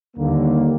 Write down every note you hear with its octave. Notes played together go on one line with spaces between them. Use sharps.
D#2 D3 G3 A#3